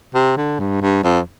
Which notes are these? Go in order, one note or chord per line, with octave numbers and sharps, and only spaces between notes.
C3
D3
G2
G2
F2